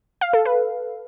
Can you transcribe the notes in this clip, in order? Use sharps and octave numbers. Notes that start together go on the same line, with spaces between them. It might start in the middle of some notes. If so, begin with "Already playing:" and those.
F5
A4
B4